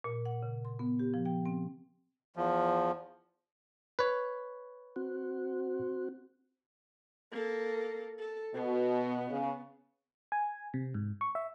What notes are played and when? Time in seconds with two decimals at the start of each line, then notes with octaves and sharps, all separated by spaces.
0.04 A#2
0.26 F#5
0.42 C#3
0.65 C6
0.79 B3
0.99 G4
1.14 F3
1.25 G5
1.46 C4
2.36 E2 F3
3.99 B4 C#5
4.96 C4 F#4
7.31 A#3 A4
8.19 A4
8.54 B2 B3
9.30 C#3
10.32 G#5
10.74 C3
10.94 G#2
11.21 C#6
11.35 E5